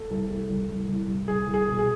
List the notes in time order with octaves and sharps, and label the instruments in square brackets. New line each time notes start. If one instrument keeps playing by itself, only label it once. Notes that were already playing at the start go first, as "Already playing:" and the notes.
Already playing: [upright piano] A3 [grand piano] A4
[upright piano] C2
A3
C2
C2
C2
C2
[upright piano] C2 [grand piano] G#4
[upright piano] C2
[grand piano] G#4
[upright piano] B2
[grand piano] G#4